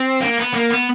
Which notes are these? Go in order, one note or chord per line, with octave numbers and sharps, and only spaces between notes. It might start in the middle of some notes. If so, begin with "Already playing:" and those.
Already playing: C4
A#3
B3
A#3
B3